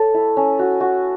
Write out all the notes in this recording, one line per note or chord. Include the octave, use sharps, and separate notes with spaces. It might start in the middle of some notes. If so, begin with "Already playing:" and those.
Already playing: A4 C#5
E4
C#4
F#4
F#4